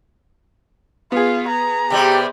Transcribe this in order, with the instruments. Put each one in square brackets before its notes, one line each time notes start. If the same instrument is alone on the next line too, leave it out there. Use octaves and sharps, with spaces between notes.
[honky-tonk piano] B3 G#4 [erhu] F4
[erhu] A#5
[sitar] C3 G3 G#3 [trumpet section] G4